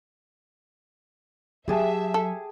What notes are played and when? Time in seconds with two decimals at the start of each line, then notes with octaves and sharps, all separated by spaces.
1.68 F#3 G4 G#4 E5 A5
2.14 A4